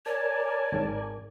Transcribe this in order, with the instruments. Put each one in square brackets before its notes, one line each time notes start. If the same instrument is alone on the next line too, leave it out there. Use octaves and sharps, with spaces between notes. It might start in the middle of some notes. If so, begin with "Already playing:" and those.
[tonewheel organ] A#4 D5 G#5 [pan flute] C#5 [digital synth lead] A5
[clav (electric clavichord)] G#1 G#2